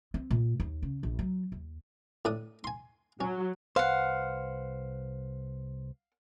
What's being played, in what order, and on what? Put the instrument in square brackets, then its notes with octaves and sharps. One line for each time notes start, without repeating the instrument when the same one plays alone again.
[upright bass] C4
A#2
D#2
C#3
A#1
F#3
D#2
[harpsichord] A2 D4 D#6
G#5 C6
[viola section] F#3 [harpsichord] C#4
[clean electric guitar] C2 B4 C5 [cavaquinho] F5 F#5